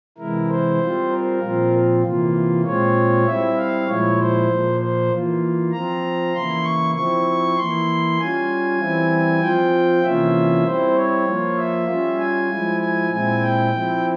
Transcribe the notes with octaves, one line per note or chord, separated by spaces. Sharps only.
C3 E3 G#3 E4 A#4
C5
G3 C4 F4
A#4
A#2 F3 C4 F4
C3 E3 A#3 F4
A#2 G#3 C4 F4 C#5
G3 C4 E4 E5
F5
A#2 F3 G#3 E4 C#5
C5
A#2 F3 A#3
C5
E3 A#3 F4
F3 C4 F4 A#5
C#3 E3 A#3 E4 C6
C#6
F3 C4 E4 C#6
E3 A#3 E4 C6
G3 C#4 F4 G#5
E3 G3 C4 E4
F3 C4 F4 G5
C3 E3 A#3 C#4 F4 E5
G3 C4 E4 C5
C#5
F3 A#3 F4
E5
G3 C#4 F4
G#5
F3 G#3 E4
G#5
A#2 G#3 C4 E4 G#5
G5
F3 C4 E4